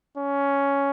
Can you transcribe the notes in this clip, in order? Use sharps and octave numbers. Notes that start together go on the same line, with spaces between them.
C#4